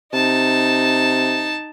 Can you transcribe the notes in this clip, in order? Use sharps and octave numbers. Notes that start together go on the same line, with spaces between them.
C3 D#4 A5